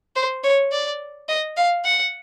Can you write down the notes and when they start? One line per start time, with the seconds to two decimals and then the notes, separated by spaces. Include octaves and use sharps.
0.16 C5
0.44 C#5
0.72 D5
1.29 D#5
1.57 F5
1.85 F#5